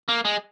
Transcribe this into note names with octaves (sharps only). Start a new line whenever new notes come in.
A#3
G#3